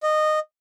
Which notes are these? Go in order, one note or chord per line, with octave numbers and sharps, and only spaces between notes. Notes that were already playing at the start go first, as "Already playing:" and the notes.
D#5